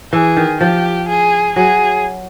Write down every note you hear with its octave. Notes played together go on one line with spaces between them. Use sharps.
E3 G#4
D#3
F3 G4
G#4
F#3 G#4